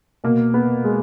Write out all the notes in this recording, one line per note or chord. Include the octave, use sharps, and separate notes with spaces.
B2 A#3
B3
G#3